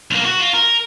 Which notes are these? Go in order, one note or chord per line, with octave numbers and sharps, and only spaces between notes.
B1 A#3
F#4
F4
A#4